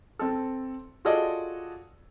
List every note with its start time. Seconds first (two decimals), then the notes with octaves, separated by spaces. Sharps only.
0.19 C4 A4
1.05 F4 F#4 G#4 A4 D5 D#5